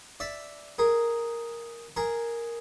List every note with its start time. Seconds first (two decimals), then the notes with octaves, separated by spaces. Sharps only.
0.20 D5 E5
0.78 G#4 A#4
1.97 G#4 A#4